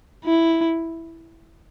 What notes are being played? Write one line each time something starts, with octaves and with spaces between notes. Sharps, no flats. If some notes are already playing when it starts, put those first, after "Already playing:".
E4